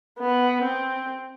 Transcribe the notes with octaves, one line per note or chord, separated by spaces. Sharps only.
B3
C4